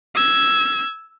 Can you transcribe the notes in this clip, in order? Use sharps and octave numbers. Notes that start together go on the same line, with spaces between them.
E6 G#6